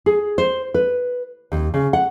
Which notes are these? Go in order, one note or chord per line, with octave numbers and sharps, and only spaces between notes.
G#4
C5
B4
D#2
C#3
F#5